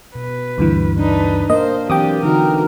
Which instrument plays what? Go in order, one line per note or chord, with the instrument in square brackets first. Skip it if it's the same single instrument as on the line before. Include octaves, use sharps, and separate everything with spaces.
[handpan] B2 [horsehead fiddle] B4
[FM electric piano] D2 G2 E3
[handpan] D4 [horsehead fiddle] D#4 B4
[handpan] A#3 A#4 [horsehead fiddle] C5 [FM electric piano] D#5
[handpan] E3 F#3 C4 [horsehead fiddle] D4 G4 [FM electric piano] G5 D6 D#6
[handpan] D3 E3 D#4 [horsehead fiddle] F#4 A#4